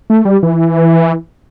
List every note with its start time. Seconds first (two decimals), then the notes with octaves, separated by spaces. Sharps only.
0.10 A3
0.25 G3
0.43 E3